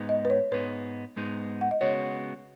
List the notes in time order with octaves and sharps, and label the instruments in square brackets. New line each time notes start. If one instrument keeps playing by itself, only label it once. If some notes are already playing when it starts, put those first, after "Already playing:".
Already playing: [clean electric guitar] G#2 G#3 B3 D#4
[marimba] D#5
B4
C#5
[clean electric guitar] G#2 G#3 B3 D#4 [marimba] B4
[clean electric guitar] G#2 G#3 B3 D#4
[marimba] F#5
D#5
[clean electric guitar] C#3 G#3 B3 F#4 [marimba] C#5